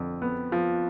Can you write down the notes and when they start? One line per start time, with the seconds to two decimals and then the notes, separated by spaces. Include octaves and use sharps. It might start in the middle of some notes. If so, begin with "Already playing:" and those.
Already playing: F2 D3
0.22 B3
0.52 F3